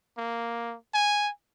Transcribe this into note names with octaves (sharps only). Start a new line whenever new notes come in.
A#3
G#5